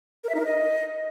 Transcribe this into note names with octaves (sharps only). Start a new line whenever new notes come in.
A#4
E5
D#4
A#4
D#5